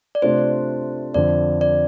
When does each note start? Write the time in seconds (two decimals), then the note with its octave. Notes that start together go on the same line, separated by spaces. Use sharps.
0.15 D5
0.22 C3 A3 D4 F4 C5
1.14 F2 D3 F3 D5
1.61 D5